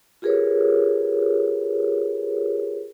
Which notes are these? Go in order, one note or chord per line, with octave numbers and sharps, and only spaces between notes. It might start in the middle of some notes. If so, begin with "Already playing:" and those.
F4 G4 G#4 A#4 B4 C#5